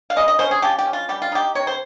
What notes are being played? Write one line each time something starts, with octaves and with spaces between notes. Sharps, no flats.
F5
C#3 D#5
D#5
C#4 C5
G#4
F3 G4
G4
C#4
F4
G3 G4
F4
D#4 G4
C3 C#5
C5